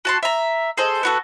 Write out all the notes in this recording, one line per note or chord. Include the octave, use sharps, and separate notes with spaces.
F#4 A5 C6
E5 A#5
G#4 A4 C5 D#5
B3 F#4 A4